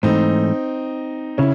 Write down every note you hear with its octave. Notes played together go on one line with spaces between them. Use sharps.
G#2 E3 A3 C4 D#4
C#3 C#4 E4